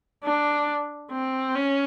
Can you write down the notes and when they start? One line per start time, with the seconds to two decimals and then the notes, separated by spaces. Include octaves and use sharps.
0.24 D4
1.11 C4
1.55 C#4